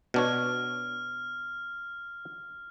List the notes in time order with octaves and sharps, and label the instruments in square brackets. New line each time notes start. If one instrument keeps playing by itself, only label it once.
[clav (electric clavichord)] B2 D4 C#5 [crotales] F6